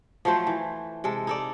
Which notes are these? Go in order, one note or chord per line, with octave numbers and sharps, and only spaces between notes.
F3 F#3 A3 C5
E3
C3 G#3 A4
D#4 A4 D5